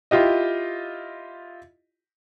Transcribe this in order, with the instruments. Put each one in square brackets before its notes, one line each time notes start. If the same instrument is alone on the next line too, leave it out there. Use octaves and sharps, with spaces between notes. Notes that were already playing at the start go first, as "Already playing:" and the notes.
[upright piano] E4 F4 G4 D#5